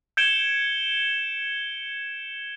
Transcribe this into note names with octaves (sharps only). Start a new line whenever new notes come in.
G6 G#6 C#7 D7 E7 G7